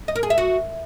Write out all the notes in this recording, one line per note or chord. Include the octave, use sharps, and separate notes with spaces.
D#5
A#4
G#4
E5
F#4